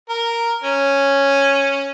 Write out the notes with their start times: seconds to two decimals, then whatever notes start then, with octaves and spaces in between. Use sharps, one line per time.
0.10 A#4
0.64 C#4